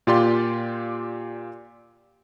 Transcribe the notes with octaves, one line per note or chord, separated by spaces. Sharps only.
A#2 F4 G4 D5 C6